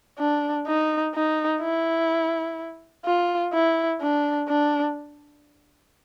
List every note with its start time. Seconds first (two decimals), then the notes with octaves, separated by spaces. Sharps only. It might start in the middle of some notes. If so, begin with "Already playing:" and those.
0.19 D4
0.67 D#4
1.14 D#4
1.62 E4
3.05 F4
3.53 E4
4.01 D4
4.49 D4